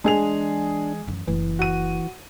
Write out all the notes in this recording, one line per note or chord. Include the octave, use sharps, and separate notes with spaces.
E3 G#3 D4 G#4 F7
F#2 E3
F#1 E3
F#4 D#7